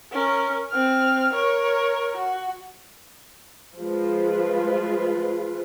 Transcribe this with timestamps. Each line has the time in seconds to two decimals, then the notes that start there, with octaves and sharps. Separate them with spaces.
0.12 C#4 A#4
0.71 C4 F6
1.33 A#4 C#5
2.16 F#4
3.77 F3 G#3 F4 B4